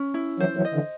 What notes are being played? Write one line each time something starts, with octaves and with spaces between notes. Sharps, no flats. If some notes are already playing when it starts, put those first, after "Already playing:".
Already playing: C#4
E4
E3 F#3 C5
E3 F#3
D#5
D3 E3